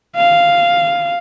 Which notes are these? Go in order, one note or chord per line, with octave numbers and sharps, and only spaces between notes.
F5